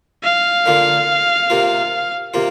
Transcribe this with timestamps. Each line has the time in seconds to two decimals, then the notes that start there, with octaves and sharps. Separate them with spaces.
0.23 F5
0.66 D3 A#3 F4
1.50 C3 A#3 F4
2.34 C3 A#3 F4